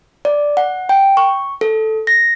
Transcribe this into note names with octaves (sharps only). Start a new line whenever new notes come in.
D5
F#5
G5
C#6
A4
A#6